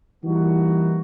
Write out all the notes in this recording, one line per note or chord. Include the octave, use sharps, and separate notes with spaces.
E3 G3 A#3 D#4 E4 F#4